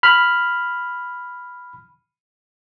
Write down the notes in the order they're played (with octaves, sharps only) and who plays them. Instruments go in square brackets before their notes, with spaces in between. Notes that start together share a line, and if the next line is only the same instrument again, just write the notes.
[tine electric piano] B5 F6